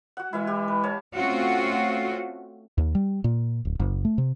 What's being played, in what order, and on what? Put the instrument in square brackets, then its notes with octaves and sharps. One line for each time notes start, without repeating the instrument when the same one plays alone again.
[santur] F#4 F#5
[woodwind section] E3 G#3 [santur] E4 E5 F5
[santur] G4 E5
B4
C#5 F5 A5
[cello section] A3 C4 C#4 F4 F#4
[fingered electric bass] D#2
G3
A#2
D1
F#1
A3
C3